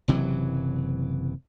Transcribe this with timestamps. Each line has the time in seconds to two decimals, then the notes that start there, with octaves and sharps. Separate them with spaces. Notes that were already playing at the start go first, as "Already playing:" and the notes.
0.08 F#1 C3 E3 F#3